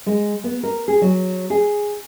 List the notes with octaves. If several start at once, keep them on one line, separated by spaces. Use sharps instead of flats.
G#3
B3
A#4
G#4
F#3
G#4